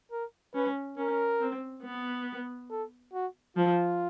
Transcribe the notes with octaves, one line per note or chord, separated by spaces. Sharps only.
A#4
C#4 B4
C#4 A#4
C4
B3
A4
F#4
F3 F4